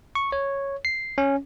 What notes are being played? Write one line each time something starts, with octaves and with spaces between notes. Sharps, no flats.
C#6
C#5
C7
C#4